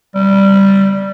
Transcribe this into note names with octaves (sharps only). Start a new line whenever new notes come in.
G3